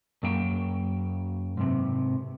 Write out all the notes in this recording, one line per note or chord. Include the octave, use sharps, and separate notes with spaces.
F#2 A#3 G5
G#2 C3